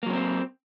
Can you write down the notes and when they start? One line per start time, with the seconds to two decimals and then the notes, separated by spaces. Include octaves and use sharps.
0.03 A#3
0.06 F#3
0.10 C#4
0.13 C4